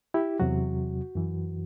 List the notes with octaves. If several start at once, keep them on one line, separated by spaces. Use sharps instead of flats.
E4 G4
E2 C3 F#3 F#4
F#2 E3